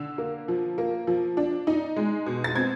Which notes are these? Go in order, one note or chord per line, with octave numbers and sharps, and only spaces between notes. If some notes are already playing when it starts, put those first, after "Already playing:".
Already playing: D3 E6
A#3
F3
A#3
F3
D4
D#4
G#3
B2
A6
C4 G#6